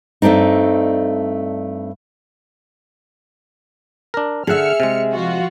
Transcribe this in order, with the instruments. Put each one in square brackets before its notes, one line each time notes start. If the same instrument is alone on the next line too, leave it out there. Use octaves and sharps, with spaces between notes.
[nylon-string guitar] G2 A3 C4 D4 D#4
[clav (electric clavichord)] D4 A#4
[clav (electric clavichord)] D3 F#5 [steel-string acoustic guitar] G#4 E5 [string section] F6 C#7
[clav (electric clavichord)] C3 G#3
[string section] F3 F4 F#4